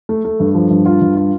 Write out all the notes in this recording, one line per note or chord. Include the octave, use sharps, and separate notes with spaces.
A3
A3
G2
F3
G2
F4
G2
F4